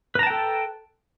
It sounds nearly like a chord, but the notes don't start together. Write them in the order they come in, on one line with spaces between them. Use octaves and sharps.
B4 A#5 A5 G5 A4